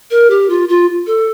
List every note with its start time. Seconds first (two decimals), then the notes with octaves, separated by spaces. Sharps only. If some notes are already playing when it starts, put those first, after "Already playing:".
0.11 A#4
0.30 G4
0.50 F4
0.69 F4
1.07 A4